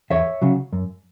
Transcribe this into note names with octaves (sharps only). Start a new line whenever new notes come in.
E2 C#5 E5
C#3 F#3
F#2